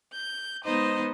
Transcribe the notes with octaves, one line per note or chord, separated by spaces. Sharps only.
G6
G#3 B3 D#4 C5 D#5